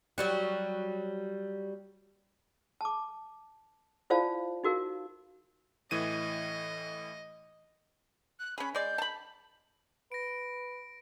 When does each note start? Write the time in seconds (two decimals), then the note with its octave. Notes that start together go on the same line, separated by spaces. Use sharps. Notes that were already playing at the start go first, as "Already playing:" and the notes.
0.18 F#3 G3 F#4
2.81 A5 D6
4.10 E4 F4 C5 D5 F5 A5
4.64 D#4 F#4 A#4 F5
5.91 A2 E3 D#5 D#7
8.39 F#6
8.58 C#4 G#4 B5
8.75 G#3 D5 G6
8.98 A5 B5
10.12 B4 A#6 D7